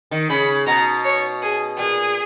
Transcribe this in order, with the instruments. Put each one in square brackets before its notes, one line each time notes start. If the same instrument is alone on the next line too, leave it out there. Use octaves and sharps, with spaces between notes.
[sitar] D#3
[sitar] C#3 [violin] B5
[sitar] B2 [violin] A#5
[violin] C#5
G#4
[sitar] A#2 [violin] G#4